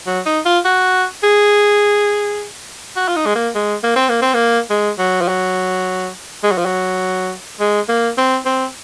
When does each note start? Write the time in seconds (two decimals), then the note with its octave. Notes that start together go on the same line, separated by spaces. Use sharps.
0.07 F#3
0.26 D#4
0.45 F4
0.65 F#4
1.23 G#4
2.96 F#4
3.08 F4
3.16 D#4
3.26 G#3
3.35 A#3
3.55 G#3
3.83 A#3
3.96 C4
4.09 A#3
4.22 C4
4.34 A#3
4.70 G#3
4.98 F#3
5.21 F3
5.28 F#3
6.43 G#3
6.51 F#3
6.58 F3
6.66 F#3
7.60 G#3
7.89 A#3
8.18 C4
8.46 C4